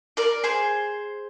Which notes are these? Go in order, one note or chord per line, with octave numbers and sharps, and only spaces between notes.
A#4 D5
G#4 C5